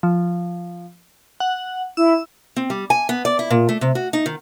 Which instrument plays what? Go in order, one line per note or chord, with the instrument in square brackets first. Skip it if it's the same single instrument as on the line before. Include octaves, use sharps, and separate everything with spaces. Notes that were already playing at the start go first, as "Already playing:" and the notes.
[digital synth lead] F3
F#5
[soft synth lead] E4 [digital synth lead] E6
[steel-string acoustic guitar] C4
G3
G#5
B3
D5
E4
A#2
A3
C3
F#4
D#4
D#3